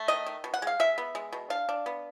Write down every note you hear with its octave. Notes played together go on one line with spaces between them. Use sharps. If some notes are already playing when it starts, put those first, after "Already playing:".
Already playing: A3
D#3 D#5
D#3
B2
F#5
G#3 F5
G#3 E5
B3
G#3
B2
D4 F5
D4
B3